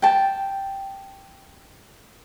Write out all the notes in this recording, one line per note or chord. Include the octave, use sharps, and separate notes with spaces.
G5 A5